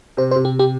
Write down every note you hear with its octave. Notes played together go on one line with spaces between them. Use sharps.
C3 C5
C5
C3
G4
G4